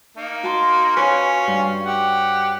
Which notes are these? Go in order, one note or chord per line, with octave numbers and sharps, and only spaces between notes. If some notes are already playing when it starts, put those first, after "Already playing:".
A#3 D#4
F#4 A5 C6
C#4 F4 B4 C#5 G#5
G2
G4 F#5